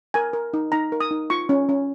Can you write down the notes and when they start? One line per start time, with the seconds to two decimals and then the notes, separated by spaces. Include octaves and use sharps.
0.14 A#4 G#5
0.33 A#4
0.54 D#4
0.72 D#4 A#5
0.92 A#4
1.00 D#6
1.11 D#4
1.30 F4 C#6
1.49 C#4
1.69 C#4